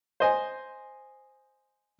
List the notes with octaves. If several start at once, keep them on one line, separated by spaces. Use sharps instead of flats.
C5 D#5 G#5